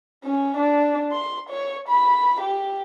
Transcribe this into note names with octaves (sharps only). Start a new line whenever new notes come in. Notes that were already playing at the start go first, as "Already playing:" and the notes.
C#4
D4
C6
C#5
B5
G4